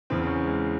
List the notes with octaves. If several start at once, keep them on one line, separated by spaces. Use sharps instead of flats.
E2 C#3 E3 C4
C4
C#4
G#3